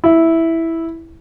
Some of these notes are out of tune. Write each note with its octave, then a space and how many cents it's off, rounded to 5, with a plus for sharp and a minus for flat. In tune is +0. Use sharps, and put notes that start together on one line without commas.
E4 -5